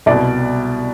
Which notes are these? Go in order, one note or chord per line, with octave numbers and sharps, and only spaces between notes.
C2 B2 D5